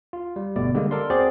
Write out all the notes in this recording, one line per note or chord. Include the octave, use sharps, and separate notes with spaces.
F4
G3
G1 B2 A3 D5
D3 G3 G#3 A#3
A4 A#4 D5 C6
C4 F#4 G#4 C5 D5